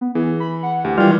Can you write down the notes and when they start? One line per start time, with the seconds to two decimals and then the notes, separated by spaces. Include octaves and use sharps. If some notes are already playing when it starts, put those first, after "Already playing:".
0.01 B3
0.15 E3 G#4
0.40 B5
0.63 F#5
0.84 D2 G4
0.98 D#3 E3 G3 F4